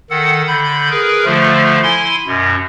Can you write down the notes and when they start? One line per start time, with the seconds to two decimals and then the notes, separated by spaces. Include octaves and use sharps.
0.10 D#3 A4 F#5
0.48 D3 B5 G6
0.90 G#4 A#4 B4
1.25 D3 F3 A3 F4
1.83 E4 G#5 C6
2.27 F#2 B2